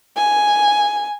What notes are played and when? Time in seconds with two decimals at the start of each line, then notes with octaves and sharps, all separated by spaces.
0.17 G#5